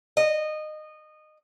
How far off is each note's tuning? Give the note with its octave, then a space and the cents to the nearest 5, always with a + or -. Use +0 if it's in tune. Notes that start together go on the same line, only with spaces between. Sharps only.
D#5 -20